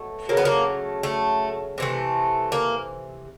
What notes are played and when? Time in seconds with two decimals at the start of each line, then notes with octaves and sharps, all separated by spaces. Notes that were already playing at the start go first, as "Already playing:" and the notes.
Already playing: B2 F#3 A3
0.29 C#3 F#3 A3 A#3
0.37 B3
0.45 A#3
1.03 A3
1.78 C3 E3 A3
2.52 A#3